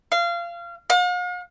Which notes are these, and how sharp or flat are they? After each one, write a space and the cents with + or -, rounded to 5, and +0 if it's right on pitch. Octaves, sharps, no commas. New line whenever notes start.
F5 -25
F5 +45